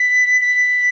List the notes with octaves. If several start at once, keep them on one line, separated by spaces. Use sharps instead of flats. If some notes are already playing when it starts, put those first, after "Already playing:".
Already playing: B6
B6